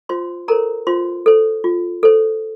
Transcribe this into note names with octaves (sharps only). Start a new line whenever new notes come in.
F4 C5 C6
A4 A#4 C5 A#5
F4 C5 C6
A4 C5
F4
A4 C5